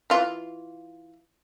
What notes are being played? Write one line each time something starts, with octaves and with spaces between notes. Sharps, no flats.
E3 F4